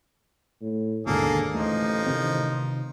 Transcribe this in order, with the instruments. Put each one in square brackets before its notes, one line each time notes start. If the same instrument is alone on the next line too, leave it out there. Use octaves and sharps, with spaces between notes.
[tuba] A2
[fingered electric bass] D#2 G#2 B2 [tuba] D3 [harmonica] A#3 G#4 A4
[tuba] A1 [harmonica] F3 D#4 [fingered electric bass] A3
[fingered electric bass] C3 D#3 C4